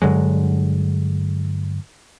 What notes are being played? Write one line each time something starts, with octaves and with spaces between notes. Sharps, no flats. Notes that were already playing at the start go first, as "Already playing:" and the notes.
G2 D3 F#3 G#3